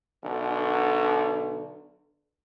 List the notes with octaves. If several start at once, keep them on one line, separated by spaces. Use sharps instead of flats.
B1 D3